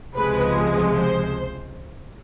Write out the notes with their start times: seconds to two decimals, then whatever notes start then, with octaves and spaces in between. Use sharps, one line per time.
0.15 C#2 C3 F3 G#3 B4
0.95 C5